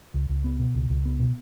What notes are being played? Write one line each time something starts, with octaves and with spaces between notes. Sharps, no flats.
C#2
C#2
B3
B2
C#2
C#2
B3
B2